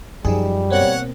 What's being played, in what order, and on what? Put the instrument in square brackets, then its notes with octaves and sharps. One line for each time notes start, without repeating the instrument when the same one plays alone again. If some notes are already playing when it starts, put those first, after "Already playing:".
[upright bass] F#2 [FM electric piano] F3 D#4 G#4 [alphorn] G3
[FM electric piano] B2 A#3 C4 [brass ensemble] C#5 F#5